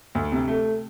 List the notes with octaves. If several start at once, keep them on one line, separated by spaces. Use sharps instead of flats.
D2
C3
A3